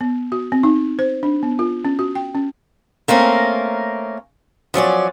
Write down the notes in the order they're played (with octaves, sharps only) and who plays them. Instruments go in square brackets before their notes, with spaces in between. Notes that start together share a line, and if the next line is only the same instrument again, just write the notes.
[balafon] B3
F#4
C4
D#4
C5
D4
B3
F4
C#4
F#4
G5
C#4
[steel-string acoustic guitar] A3 A#3 C4 C#4 A#4
F3 F#3 C#4 D5